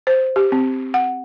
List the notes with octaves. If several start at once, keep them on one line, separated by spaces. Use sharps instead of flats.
C5
G4
C4
F#5